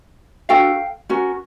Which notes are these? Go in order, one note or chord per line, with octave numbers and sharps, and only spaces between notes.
D4 F#4 A4 F5 G5
C#4 F#4 A#4